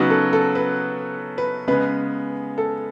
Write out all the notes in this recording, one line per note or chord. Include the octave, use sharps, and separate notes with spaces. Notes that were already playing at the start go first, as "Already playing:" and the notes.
Already playing: C#3 F#3 B3 D#4 F#4
A4
A4
B4
B4
C#3 G#3 B3 B4
A4